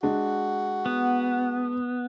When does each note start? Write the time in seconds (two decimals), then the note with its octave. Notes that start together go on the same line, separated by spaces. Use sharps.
0.03 G#3 D4 F#4
0.86 B3